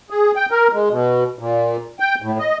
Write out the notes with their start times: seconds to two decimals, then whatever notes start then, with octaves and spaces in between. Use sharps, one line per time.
0.10 G#4
0.36 G5
0.51 A#4
0.73 G#3
0.90 B2
1.39 A#2
2.00 G5
2.22 A2
2.39 D#5